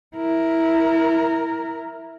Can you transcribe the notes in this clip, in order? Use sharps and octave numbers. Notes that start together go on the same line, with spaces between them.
E4 A#4